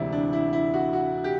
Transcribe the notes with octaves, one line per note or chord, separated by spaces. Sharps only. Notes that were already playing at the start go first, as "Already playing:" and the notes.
Already playing: E1 D2 C3 E3 E4 D5
D4
E4
E4
F#4
F#4
G4